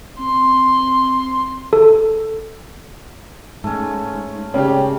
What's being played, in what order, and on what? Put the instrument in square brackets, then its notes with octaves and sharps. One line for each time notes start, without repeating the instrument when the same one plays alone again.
[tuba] C4 [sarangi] C6
[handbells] A4
[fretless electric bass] G#2 [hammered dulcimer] A3 C#4
[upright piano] C#3 G4 [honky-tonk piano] C#5 D5 G5